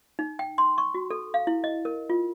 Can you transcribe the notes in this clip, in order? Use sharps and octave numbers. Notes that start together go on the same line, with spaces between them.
D#4
G5
C6
C#6
F#4
A4
F5
E4
D#5
A#4
F4